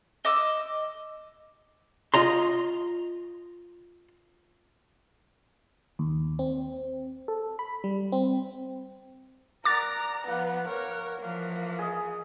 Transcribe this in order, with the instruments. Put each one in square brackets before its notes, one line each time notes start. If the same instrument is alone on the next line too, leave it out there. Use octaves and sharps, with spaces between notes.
[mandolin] D#5 D6 E6
[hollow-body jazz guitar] F4 D#5 A#5 C6
[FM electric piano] D#2
C4
A4
B5
G3
C4
[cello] A#4 [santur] D5 F#5 [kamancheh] A#5 [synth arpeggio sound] D6 A6
[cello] F3 [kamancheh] B3 [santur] F5 F#5
[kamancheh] A#4 [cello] C#5 [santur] F#5
[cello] E3 F3 [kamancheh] A#3
[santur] G#4 D#5